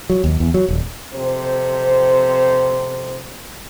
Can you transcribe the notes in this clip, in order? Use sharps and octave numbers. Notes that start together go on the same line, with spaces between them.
F#3
D#2
E2
F#3
D#1
F2 C3 C5